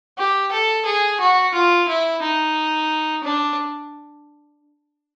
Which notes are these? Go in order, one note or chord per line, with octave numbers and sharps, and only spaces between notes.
G4
A4
G#4
F#4
F4
E4
D#4
D4